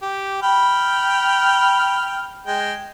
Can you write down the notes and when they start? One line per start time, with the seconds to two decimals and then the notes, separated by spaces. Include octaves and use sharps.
0.03 G4
0.43 G5 B5 F6
2.47 G#3 G5